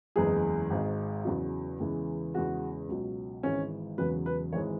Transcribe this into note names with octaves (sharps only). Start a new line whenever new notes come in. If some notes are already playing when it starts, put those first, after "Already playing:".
F#1 E2 E3 G#3 G#4
G#1 G#2 G#3
E2 C#3 F#3
E2 C#3 E3 G#3
E2 C#3 G#3 F#4
C#2 B2 F#3
G#1 G#2 E3 G#3 C#4
E1 E2 C#3 F#3 B4
B4
G#1 G#2 E3 G#3 C#5